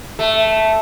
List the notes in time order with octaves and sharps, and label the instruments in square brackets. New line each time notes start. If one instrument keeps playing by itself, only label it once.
[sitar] A3